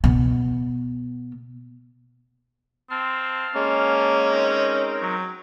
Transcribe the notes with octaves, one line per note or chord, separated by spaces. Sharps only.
B2 B3
C4 F5 A5 F6
G#3 A#3 C#4
C4 D#4 A#4
F#3